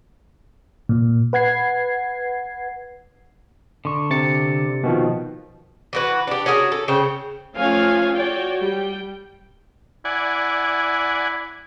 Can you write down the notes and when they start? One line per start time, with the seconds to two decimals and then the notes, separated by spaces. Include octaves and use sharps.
0.89 A#2
1.33 B4 F#5 G#6 C7
3.85 D3 C#6
4.10 C3 A6 C#7
4.83 B2 D#3 F3
5.93 E3 F#4 B4
6.27 D4 G4
6.46 C#4 F#4 G#4 A#4
6.72 A4
6.88 C#3 C5 C#5 G5
7.56 F3 A3 C#4 C#5 F5 G#5
8.14 F#4 C#5 D5 G5
8.58 G3 G5
10.05 E4 D5 F#5 G#5